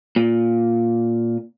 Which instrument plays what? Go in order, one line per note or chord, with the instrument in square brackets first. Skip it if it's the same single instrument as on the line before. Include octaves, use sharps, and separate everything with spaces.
[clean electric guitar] A#2